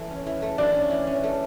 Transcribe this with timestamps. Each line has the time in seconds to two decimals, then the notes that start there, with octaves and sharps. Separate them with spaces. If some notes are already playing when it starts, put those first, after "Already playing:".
Already playing: E3 A3
0.10 C#4
0.27 E3
0.42 A3
0.58 E3 D4
0.74 C#4
0.91 E3
1.07 C#4
1.24 A3